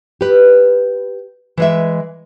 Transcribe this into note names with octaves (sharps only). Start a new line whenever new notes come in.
G4 B4
E3 G#3 E5